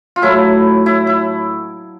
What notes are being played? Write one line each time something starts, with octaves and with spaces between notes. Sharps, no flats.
F4
A2 F#3 A3 E4
E4
E4